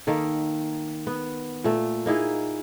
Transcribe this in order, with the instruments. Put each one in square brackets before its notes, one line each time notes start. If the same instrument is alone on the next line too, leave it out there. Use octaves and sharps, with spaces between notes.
[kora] D#3 A#3 A4
B3
A#2 A3
A#3 D#4 E4 G#4